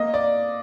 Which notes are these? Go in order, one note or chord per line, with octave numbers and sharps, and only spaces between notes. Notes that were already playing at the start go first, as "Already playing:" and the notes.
Already playing: A#3 D#5
D5